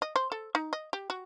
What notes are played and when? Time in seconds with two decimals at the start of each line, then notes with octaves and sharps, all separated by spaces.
0.02 D#5
0.16 C5
0.32 A4
0.55 D#4
0.73 D#5
0.93 G4
1.10 F#4